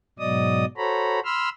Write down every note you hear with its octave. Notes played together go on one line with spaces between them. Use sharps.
G#2 B2 F#3 D5 D#5 D#6
F#4 A4 C5 C#5 A#5 B5
B5 C6 E6 F6